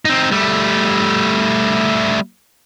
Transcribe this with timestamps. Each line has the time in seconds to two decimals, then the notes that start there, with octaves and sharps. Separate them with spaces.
0.05 C4 D#4
0.31 G3 A3